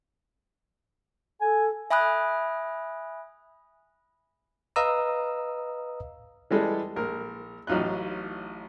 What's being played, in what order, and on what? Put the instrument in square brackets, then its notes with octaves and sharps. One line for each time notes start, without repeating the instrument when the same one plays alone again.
[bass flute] A4 [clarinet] G#5
[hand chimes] E5 G#5 B5 D#6 F#6
[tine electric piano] B4 D#5 F5 A#5 D#6 E6
[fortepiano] E3 G3 G#3 A4
A#1 A#4
A1 F#3 D#4 F4 F#6